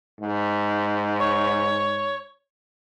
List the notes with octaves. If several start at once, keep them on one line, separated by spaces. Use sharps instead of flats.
G#2
C#5